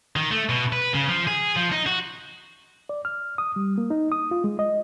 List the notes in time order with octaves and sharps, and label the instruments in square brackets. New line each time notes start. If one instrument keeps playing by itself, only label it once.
[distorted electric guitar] D#3
A3
B2
B4
C#3
F3
G#4
F3
D#4
F#4
[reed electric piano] D5
F6
D#6
G3
A#3
D#4
D#6
F4
G#3
D#5